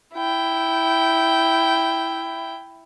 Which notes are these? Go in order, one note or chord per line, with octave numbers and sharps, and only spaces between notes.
E4 G5